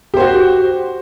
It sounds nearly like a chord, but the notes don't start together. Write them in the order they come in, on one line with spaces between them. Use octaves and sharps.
G4 C5 F#4